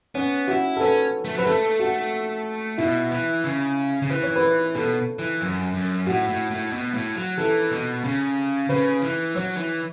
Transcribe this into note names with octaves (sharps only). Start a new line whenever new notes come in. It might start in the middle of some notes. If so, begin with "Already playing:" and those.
B3 C#4
E4 F#4
A4
C#4 B4
A3
F#3 B4
A3 A4
F#4
B2 E4
E3
C#3
C#3
E3 B4
C#5
B4
B2 A4
E3
F#2
F#2
A2 F#4
A2
A2
B2
A2
F#3
E3 A4
B2
C#3
C#3 B4
E3
F#3 C#5
E3